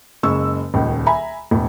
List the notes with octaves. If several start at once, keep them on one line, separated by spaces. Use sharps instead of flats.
F#1 C#3 G#3 C#6 E6
D#1 C#2 D#3
E5 G#5 A#5 B5
E1 A2